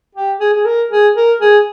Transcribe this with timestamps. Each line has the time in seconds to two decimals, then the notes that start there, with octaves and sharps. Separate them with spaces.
0.15 G4
0.40 G#4
0.54 G#4
0.65 A#4
0.90 G#4
1.16 A#4
1.40 G#4